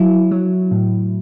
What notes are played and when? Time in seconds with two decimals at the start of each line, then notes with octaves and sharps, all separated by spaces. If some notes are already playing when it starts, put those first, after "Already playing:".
Already playing: F#3 E4
0.31 F#3
0.71 A2